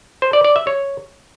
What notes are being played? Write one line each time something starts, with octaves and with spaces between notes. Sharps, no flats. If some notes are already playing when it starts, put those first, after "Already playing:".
C5
D5
D5
E5
C#5